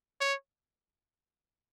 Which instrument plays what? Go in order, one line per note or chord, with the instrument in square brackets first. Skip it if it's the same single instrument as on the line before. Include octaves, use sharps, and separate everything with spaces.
[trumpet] C#5